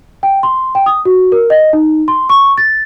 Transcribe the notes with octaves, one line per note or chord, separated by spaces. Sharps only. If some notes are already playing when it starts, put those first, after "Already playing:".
G5
C6
G5
D#6
F#4
A#4
D#5
D#4
C6
C#6
A6